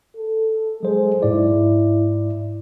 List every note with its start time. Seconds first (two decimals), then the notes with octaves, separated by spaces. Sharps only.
0.17 A4
0.83 F#3 G#3 C5
1.23 G#2 E4 D5